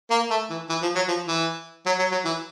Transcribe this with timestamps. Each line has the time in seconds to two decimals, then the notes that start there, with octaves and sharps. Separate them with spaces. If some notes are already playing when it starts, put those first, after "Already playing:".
0.11 A#3
0.30 A3
0.50 E3
0.69 E3
0.82 F3
0.95 F#3
1.08 F3
1.28 E3
1.86 F#3
1.99 F#3
2.12 F#3
2.25 E3